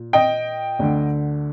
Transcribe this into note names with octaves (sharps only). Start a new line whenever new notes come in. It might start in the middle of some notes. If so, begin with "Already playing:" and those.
Already playing: A#2
D#5 G5
D2 D3